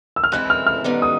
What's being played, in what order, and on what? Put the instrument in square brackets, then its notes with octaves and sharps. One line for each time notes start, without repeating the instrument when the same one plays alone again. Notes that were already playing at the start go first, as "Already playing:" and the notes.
[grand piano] E6
F6
[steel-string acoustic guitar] E3 G#3 C4 E4 [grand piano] F#6
[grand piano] F6
F6
[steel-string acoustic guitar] G#2 D#3 G3 B3 D#4
[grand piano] D#6